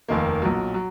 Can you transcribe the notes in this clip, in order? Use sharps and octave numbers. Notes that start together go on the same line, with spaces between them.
F1 D#2 D#3 A#3
B1 A#2 F#3
F#3